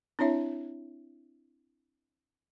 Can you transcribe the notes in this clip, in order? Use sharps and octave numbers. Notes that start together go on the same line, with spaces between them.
C4 D4 E4 C#5 E5